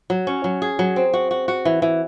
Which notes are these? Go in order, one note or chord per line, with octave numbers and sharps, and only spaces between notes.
F#3
C#4
F#3
G#4
F#3
C4
F#4
F#4
F#4
E3
E3